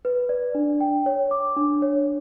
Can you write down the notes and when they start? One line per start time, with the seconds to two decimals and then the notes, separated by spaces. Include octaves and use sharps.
0.05 B4
0.29 D5
0.55 D4
0.80 G5
1.06 C#5
1.31 D6
1.56 D4
1.82 C#5